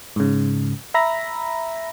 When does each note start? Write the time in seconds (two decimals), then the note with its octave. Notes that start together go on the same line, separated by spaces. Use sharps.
0.16 G#2 C#3
0.94 E5 A#5 B5 A#6